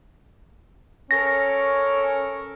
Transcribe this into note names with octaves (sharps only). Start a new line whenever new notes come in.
C#4 A4 A#4 A#6